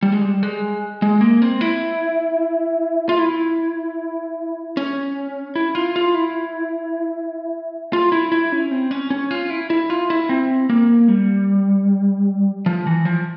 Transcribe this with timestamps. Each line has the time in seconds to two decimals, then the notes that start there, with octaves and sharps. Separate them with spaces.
0.03 G3
0.12 G#3
0.21 G3
0.43 G#3
1.02 G#3
1.21 A#3
1.42 C4
1.61 E4
3.09 F4
3.19 E4
4.77 C#4
5.56 E4
5.75 F4
5.96 F4
6.14 E4
7.93 F4
8.12 E4
8.32 E4
8.52 C#4
8.71 C4
8.91 C#4
9.10 C#4
9.31 F4
9.50 E4
9.70 E4
9.90 F4
10.10 E4
10.29 C4
10.70 A#3
11.08 G3
12.66 F3
12.87 E3
13.05 F3